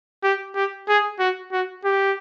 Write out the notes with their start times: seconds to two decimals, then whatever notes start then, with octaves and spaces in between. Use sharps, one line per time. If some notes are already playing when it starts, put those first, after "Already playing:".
0.24 G4
0.55 G4
0.88 G#4
1.19 F#4
1.52 F#4
1.85 G4